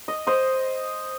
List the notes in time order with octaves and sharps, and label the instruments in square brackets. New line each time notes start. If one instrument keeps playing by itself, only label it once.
[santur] D#5
C5 D#5